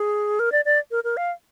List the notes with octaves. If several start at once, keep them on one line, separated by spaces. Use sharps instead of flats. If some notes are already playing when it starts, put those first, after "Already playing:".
Already playing: G#4
A#4
D5
D5
A#4
A#4
F5